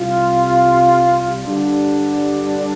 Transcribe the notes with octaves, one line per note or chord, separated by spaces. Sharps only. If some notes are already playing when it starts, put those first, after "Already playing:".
Already playing: C2 C3 G3 F4
G2 D3 G3 D4